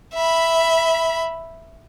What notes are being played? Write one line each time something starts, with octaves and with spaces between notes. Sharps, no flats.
E5 B5